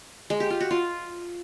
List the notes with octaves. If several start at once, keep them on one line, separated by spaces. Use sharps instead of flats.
G#3
G4
F4
F#4
F4